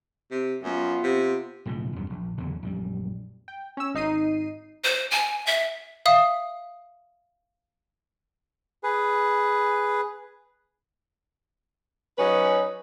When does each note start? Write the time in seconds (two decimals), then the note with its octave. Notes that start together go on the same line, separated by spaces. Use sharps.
0.31 C3
0.63 F#2 B3 F4
1.03 C3
1.66 B1 A2 C#3 F3
1.96 E2 G2 F#3
2.10 A#1
2.37 F#1 E2 D3 F#3
2.63 A#1 F#2 G3
3.48 G5
3.77 C#4 E6
3.94 G#1 D#4 C7 D#7
4.84 C5
5.11 G#5
5.47 E5
6.06 E5 F5 D#6
8.84 G#4 B4
12.18 F#3 C#4 D#4 B4